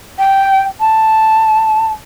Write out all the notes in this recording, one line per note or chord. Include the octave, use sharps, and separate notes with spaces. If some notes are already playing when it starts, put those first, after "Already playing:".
G5
A5